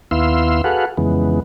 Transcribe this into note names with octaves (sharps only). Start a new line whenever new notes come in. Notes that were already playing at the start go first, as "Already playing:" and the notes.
D#2 B3 E4 F5 C6 E6
F#4 G#4 A4 B4 F5 F#5
F2 C#3 E3 G#3 B3